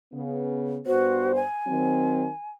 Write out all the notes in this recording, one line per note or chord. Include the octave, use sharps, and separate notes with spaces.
C#3 B3
G2 B3 F#4 C5
G#5
D#3 F#3 C4